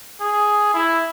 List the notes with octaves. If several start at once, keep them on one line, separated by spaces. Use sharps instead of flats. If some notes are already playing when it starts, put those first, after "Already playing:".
G#4
E4